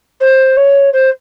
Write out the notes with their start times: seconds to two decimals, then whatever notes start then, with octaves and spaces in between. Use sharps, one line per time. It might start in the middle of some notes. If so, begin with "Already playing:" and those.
0.21 C5
0.57 C#5
0.93 C5